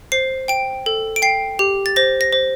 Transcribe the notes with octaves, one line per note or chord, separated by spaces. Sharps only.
C5 C7
G5 D7
A4
D7
G5 C7
G4
A6
C5 A#6
A#6
C5